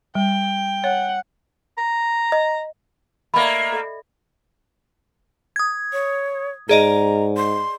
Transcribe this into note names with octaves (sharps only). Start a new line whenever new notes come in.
G3 G5
C#5 F#5
A#5
D#5
A3 A#3 D5 D#5 B5
A4 E5
D#6 G#6
C#5
G#2 G#4 D5 D#5 A#5
C6